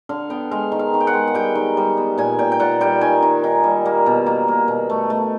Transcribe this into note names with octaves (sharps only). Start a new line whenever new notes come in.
D3 F5
B3 G5
G#3 F5
D#3
F5
D#3
G5
F#5
G#3
F#5
G3 G5
D#3
G3
B3
A#2 G#5
A#2 G5
G5
A#2 F#5
G3 G5
D#3 G#5
D#3
D#3
G3
A#3
B2
A#3
A#3
B2
A3
A3